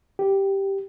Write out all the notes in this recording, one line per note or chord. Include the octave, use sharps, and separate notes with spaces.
G4